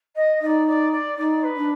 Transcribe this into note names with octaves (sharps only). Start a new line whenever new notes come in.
D#5
D#4 D5 D#5
D5
D5
D#4 D5
B4
D4